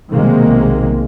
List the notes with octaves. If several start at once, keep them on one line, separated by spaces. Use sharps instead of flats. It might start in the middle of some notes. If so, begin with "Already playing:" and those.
B1 C3 D#3 G#3 A#3